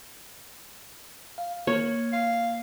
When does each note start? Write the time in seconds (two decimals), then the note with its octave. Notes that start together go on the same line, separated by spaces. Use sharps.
1.38 F5
1.67 A#3 C#5
2.13 F5